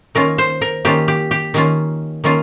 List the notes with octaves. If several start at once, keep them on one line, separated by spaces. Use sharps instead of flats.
D#3 A#3 C#4 F4 A#4
C5
A#4
D#3 A#3 C#4 F4 G4
G4
G4
D#3 A#3 C#4 F4
D#3 A#3 C#4 F4